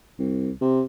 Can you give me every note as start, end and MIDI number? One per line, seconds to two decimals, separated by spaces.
0.19 0.51 36
0.61 0.82 48